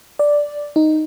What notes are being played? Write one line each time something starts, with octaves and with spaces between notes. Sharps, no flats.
D5
D#4